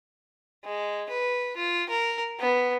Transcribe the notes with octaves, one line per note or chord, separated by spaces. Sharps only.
G#3
B4
F4
A#4
B3